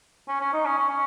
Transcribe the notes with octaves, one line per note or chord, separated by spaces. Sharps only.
C#4
C#4
D#4
C#4
C#4
C#4